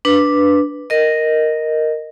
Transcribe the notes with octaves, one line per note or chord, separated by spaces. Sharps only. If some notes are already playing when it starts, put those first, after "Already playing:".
D4 B4
A#4 D#5